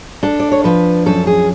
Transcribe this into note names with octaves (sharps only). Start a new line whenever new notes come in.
D4 A4
D5
C#5
F3 B4
F#2 A4
G#4